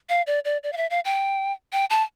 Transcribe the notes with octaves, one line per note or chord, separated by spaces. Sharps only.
F5
D5
D5
D5
F5
E5
F5
G5
G5
A5